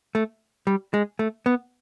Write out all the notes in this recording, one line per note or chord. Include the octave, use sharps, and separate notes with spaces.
A3
G3
G#3
A3
B3